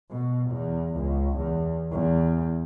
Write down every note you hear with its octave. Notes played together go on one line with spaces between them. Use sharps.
B2
E2
C#2
E2
E2